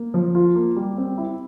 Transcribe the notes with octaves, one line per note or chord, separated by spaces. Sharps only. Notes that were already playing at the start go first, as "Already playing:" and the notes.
Already playing: A#3
F3
F4
A#3
G3
C4
E4